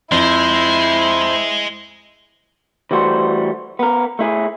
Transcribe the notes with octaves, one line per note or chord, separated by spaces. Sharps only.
F2 G#3 E4 C5
E3 G3 A3 F#4 C5
B3 A#4
A3 E4 G#4